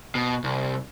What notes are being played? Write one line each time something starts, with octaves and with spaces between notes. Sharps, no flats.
B2
C2